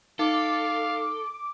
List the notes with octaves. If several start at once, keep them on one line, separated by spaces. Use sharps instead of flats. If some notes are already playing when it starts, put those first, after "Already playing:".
D#4 A4 F5 D6